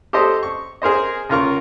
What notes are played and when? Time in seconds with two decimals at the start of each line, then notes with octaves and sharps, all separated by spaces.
0.13 G4 A4 C5 D#5
0.43 C#6
0.82 G#4 A#4 C5 D#5
1.29 C#2 F4 A#4 C#6